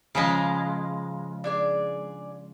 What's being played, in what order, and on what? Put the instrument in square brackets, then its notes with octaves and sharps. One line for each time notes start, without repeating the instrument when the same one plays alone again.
[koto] C#3 F3 G#3 [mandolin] F5 A#5 B5
[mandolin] D4 G#4 D5